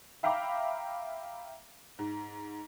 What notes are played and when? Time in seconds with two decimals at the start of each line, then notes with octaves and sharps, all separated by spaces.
0.23 E5 F5 G5 A#5 B5 D6
1.99 G#2